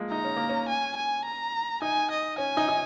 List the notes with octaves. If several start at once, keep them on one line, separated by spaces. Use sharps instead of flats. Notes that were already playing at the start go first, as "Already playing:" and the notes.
Already playing: F3 G#3 A#3
D#4 A#5
C#4
A#3
C#4
G#5
G#5
A#5
D#4 G#5
D#5
C#4 G#5
D#4
D#4